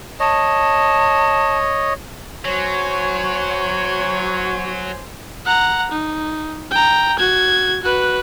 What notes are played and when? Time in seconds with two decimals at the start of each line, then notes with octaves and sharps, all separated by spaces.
0.20 C#5 D#5 A5
2.45 F#3 F#4 C5 C#5 G#5
5.45 F#5 A#5
5.92 D#4
6.71 G5 A#5
7.19 F#4 G#6
7.82 F#4 B4